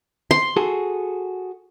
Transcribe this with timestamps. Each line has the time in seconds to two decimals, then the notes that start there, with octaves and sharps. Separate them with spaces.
0.31 C6
0.57 F#4 G#4 A4